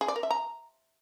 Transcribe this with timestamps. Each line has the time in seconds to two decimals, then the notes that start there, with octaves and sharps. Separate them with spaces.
0.01 G#4
0.08 D5
0.16 A#4
0.23 E5
0.31 A#5